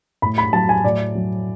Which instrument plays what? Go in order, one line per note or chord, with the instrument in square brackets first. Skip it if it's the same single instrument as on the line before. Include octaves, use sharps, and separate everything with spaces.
[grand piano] A2 B5
B5
F#3 A5
G#5
A2 D5
F#3